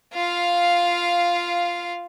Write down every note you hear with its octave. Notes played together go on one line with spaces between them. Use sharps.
F4 F5